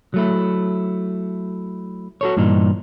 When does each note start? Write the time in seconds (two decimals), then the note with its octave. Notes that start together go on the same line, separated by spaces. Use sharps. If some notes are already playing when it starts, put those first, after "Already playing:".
0.14 F#3 A3 E4
2.21 F#4 A4 C#5
2.37 G2 A#2 E3 D4 D#4